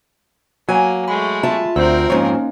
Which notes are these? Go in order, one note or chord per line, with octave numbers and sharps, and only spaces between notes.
F#3 A#3 G#5
G#3 A3 B5
F4 E5 A5
D2 C4 A#4 C5 E6
F2 G#2 F3 A#3 C#4 D#4 C#5